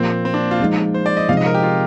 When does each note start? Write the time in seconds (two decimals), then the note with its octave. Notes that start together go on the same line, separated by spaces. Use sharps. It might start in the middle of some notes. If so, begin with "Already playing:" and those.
Already playing: A#2 F3 A#3 C4
0.25 C4
0.34 D4
0.51 F4
0.60 F3 G#3 D#4
0.94 C5
1.06 D5
1.17 D#5
1.28 C3 F3 G#3 C4 D#4 F5
1.37 D#5
1.46 A#4
1.54 G4
1.63 F4